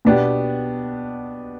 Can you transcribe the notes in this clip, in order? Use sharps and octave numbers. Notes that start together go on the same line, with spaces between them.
B2 B3 D4 G4